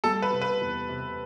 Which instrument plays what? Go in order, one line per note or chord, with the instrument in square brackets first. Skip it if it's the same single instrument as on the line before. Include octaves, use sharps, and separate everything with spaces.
[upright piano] G3 [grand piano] A4
[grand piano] B4
[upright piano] C3
[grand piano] B4
[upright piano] E2
C3